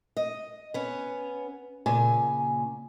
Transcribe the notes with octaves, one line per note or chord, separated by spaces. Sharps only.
D#5
B3 C#4
A#2 C#3 G#5